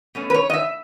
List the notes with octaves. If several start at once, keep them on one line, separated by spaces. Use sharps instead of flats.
B2 A3 C#4
B4
C#5
D#5
E5